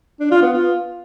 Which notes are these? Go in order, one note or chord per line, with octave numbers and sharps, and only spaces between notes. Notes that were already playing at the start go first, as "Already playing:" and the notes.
D4
F4
B3
F4